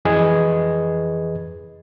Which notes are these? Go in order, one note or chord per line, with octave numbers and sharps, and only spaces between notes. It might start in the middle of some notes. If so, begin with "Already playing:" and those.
F2 E3 G#4 B4 D#5 G#6